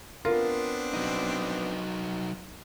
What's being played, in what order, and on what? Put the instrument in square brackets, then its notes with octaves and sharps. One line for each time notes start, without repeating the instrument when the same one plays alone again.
[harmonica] B3 C4 D4 [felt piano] F4 A#4
[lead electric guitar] F#3 D#4